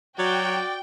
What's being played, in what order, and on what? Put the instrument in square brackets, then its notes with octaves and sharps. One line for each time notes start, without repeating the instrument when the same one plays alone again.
[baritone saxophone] F#3 [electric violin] F#4 [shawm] D5 [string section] G5